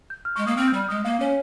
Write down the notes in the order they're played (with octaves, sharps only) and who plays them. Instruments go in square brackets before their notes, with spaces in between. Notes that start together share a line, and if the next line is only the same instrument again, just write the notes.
[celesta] G6
F6
[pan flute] G#3 [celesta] C#6
[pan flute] A#3 [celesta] D#6
[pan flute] C4 [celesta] F6
[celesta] G6
[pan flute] G3 [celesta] F6
[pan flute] G#3 [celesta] D#6
[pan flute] A#3 [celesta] F5
[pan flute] C#4 [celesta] C#5